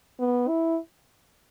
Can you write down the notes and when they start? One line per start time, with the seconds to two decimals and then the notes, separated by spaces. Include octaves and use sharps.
0.20 B3
0.48 E4